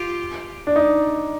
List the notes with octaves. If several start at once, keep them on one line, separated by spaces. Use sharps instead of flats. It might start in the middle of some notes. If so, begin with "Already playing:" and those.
Already playing: F4 G4
D4
D#4